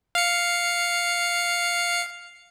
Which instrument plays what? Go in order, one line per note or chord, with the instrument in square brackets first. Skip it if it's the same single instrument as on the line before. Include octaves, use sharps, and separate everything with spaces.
[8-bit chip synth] F5 C#7